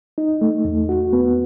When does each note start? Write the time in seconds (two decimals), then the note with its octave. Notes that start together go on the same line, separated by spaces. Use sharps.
0.18 D#4
0.41 A3
0.65 E2
0.89 F#4
1.13 B3